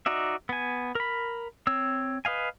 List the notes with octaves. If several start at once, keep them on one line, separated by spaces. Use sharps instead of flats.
D#4 F#4 D5 E5
B3 G#5
A#4 B5
C4 C#5 E6
B4 D#5 F5 G#5